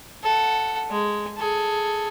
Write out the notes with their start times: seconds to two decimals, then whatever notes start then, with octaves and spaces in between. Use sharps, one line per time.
0.23 A4 F#5
0.90 G#3
1.37 G#4 A4